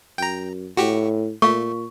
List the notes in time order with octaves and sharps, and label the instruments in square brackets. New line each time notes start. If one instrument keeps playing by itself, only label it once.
[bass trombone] F#2 [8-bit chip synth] G5 A#5
[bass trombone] A2 [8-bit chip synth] F#4 G4 C#6
[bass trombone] A#2 [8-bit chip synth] A3 [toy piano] F5 C#6